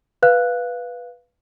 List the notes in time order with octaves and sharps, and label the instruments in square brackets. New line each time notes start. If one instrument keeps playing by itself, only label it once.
[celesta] B4 F5 F#6